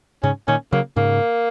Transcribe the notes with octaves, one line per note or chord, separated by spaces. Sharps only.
G#2 C#3 C#4
A#2 D#3 C#4
C#3 F#3 A#3
G#2 C#3 A#3